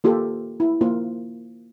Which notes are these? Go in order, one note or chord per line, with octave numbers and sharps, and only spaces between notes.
A#3 F4 G4 A4
E4
A#3 F4